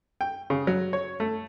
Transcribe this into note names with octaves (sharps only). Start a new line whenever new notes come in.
G5
C#3
F#3
C#5
A3